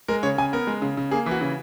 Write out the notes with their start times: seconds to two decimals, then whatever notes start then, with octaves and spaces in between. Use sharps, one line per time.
0.08 G#3 A#4
0.23 C#3 C#5
0.38 C#3 G#5
0.53 B3 A#4
0.67 G#3
0.82 C#3
0.97 C#3
1.11 A#3 G#4
1.26 E3 F#4
1.41 C#3